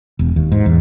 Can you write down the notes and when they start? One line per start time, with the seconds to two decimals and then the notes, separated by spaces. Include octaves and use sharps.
0.19 E1
0.36 D#2
0.52 G#2
0.66 E2